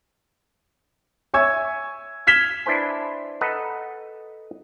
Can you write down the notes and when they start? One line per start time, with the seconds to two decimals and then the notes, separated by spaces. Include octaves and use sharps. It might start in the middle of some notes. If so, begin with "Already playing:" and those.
1.34 C#5 E5 G#5 C#6 E6 G#6
2.27 F6 G#6 B6 E7 F7 G7
2.66 D4 E4 B4 C5 G#5
3.41 A4 B4 D#5 F#5 A5 A#5